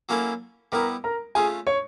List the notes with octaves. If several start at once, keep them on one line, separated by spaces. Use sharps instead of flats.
F#3 A#3 C#4 E4 A4
G3 B3 E4 A#4 A#5
A#4 A#5
A3 C#4 F4 G#4 G#5
C#5 C#6